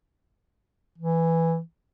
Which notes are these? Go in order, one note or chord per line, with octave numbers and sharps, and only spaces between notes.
E3